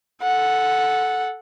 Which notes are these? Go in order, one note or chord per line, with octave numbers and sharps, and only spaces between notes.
A4 F#5